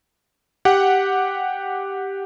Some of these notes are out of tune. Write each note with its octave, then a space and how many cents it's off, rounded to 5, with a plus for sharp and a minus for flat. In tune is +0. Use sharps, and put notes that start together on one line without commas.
G4 +0 F#5 +0